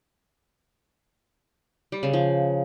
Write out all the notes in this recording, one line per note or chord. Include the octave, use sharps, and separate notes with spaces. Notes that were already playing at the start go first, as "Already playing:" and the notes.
G3
C#3
F3